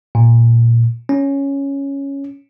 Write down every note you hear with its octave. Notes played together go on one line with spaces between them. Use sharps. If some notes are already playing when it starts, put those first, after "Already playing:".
A#2
C#4